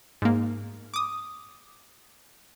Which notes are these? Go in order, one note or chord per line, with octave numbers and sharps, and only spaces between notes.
G#2 A#3
D6 D#6